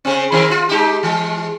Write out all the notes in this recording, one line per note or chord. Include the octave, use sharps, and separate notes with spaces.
C#3 C4
D#3 C4 A#4
F4
G#3 D#4 G4
E3 G#3